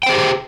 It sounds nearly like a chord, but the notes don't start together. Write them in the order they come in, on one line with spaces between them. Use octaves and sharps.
G5 C5 G#4 G4